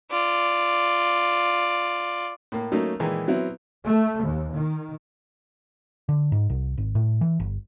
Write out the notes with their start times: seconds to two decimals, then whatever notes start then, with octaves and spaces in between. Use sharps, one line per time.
0.11 F4 D5
2.52 A2 A#3
2.72 F#3 A3 A#3 C#4 D#4
3.00 A#2 D#3 E3 G#3 A#3
3.28 F#3 B3 C4 E4
3.86 A3
4.24 D#2
4.53 D#3
6.09 D3
6.32 G#2
6.50 C2
6.77 G#1
6.95 A2
7.21 E3
7.40 G1